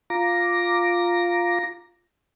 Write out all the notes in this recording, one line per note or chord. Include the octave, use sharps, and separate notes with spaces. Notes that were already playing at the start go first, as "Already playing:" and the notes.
F4 A#5 D6 A#6